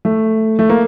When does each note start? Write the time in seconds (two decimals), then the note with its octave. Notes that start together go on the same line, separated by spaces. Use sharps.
0.05 A3
0.59 A3
0.70 A#3